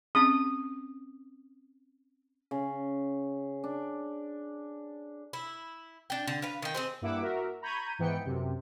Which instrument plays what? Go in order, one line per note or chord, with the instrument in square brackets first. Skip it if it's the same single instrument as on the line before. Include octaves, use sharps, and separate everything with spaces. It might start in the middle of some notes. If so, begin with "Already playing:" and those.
[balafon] C4 C#4 G#4 [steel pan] D#6
[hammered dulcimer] C#3
D4
[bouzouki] E4
D4 G5
D3
B4 F5
D#3 G5
C4 G#4 C5
[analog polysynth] G2 A#3 E4 F#5 D6 E6
F#4 A#4 E5
A#5 B5 C#6 G6 G#6 D#7
G#2 E3 B3 G5 C#7
F#2 C3